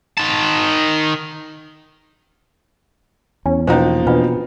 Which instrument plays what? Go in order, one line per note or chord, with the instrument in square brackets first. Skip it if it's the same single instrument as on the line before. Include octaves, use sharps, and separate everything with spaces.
[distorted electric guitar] D#3 A5
[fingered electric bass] E2 [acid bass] C#4
[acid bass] B2 [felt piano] F3 A#3 D#4 [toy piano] C#4 C5
[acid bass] B2 [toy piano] D4 F4 B4